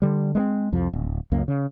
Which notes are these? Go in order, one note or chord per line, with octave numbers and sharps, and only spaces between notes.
D3 G3
G#3 A#3 C4
C2 F2 F3
D1
C#2 F#2 A#3
C#3